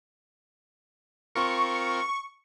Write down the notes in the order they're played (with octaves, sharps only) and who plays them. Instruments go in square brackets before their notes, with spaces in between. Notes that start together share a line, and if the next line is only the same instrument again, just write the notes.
[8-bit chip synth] C4 F4 A#4 [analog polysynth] C#6